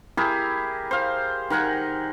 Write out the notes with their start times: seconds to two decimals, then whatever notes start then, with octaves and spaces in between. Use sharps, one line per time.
0.17 E4 G4 G#4 A#4
0.91 C5 F5
1.50 D#3 A#4 F#5 G#5